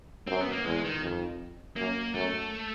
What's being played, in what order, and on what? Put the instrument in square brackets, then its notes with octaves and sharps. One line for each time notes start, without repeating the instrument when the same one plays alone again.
[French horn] F#2 [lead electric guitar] C4
[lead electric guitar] B3
A#3
[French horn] E2 [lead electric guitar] G#3
[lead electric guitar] D#3
[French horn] F2
[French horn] F#2 [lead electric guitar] A#3
[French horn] F#2 [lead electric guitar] A3